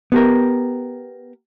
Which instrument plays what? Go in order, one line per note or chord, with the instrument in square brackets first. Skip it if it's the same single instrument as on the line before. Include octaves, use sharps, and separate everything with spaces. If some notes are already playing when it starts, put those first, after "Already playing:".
[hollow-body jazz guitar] B3 G4 A#4